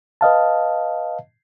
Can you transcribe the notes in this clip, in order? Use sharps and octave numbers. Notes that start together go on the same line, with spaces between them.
B4 D#5 F5 A5